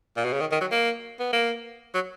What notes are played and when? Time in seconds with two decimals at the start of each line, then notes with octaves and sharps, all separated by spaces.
0.17 A#2
0.25 B2
0.33 C#3
0.41 D#3
0.52 D#3
0.61 F#3
0.72 A#3
1.20 B3
1.33 A#3
1.94 F#3